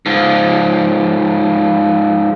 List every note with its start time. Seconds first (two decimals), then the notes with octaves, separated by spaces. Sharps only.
0.06 G#2 F3